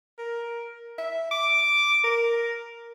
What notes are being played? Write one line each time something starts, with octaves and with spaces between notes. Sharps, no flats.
A#4
E5
D6
A#4